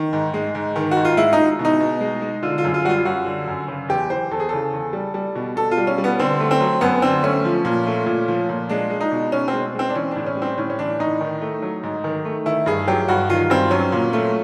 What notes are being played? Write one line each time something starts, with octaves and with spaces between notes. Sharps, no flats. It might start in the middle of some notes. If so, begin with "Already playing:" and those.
Already playing: D#3
G#2
G#3
G#2
D#3
F#4
G#2
F4
G#3 E4
D#4
G#3
B2
D#4
B2
G#3
G#3
D3 F4
F4
F#2
F4
G3 F4 F#4
F#2 F#4
D3
F#2
C#3
E2 G4
E3 C5
E2 A4
G#4
C#3 A4
E2
G3
G3
B2
B2 A4
F4
G3
C#4
G3
B3
D3 C4
A3
C4
F#3
F#2 B3
D3 C4
A3 C#4
F3
A#2
A3
A#2
F3
A#2
G#3 D4
G#3
D#4
B2
B2 C#4
C4
G#3
G#3 C4
D4
E3 C#4
A2 D4
C#4
G3
C4
A2 C#4
C#4
E3 D4
A2 D#4
D#3
A3
F#3
G#2
D#3
A3
D#3 E4
G2 G#4
F#3 G4
G2 F#4
D#3 F4
G2 C4
F#3 C#4
A#2
A3